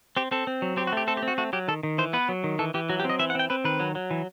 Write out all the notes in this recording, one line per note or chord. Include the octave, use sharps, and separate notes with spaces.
C4 G4
C4 A4
C4
F#3
C4 G4
F#4
A3 G4
C4 A4
G4
C4
F#4
A3 F#4
F#3 G4
D#3 A4
D#3
E3 C5
B3 B4
F#3
D#3
E3 A4
E3 G4
F#3 F#4
G4
C4
D#5
E3 E5
F#5
C4 G5
C4 B4
D#3 B4
F#3
F#3
E3